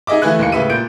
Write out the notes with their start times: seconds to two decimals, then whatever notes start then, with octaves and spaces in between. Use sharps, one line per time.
0.07 D#4 G#4 D#5 E5 D6
0.22 E3 A3 E4 B4 G#5 F#6
0.39 D#2 A#3 C#7
0.52 A2 C#3 B4 E5 D#7
0.70 A#2 G6 D7